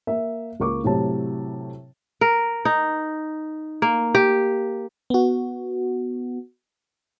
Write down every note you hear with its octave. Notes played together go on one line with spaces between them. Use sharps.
A#3 E5
C#2 A#3 C#6 D6
A2 C3 F#3 A5
A#4
D#4
A#3
G4
B3 F#4